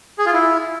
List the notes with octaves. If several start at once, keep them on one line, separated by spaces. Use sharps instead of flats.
G#4
F4
E4